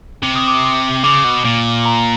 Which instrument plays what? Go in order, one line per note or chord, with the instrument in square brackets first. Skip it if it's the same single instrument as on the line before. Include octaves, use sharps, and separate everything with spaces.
[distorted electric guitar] C3 [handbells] D6
[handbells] D#6
D6
[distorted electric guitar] C#3 [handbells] D6
[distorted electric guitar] B2
A#2
[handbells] A#5